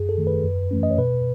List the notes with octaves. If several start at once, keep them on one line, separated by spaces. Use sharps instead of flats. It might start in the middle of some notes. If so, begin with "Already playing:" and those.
Already playing: F#2 G#4
A4
D#3 A3
B4
F#2
E3 A3 C#4
D#5
C#5
B2 B4